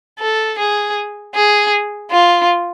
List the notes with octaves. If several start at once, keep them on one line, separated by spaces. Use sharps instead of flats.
A4
G#4
G#4
F4